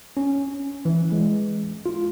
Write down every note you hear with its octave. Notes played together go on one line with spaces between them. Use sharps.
C#4
E3
G#3
F4